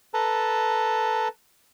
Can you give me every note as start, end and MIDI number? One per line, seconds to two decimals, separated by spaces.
0.14 1.28 69
0.14 1.28 71
0.14 1.28 81
0.14 1.28 82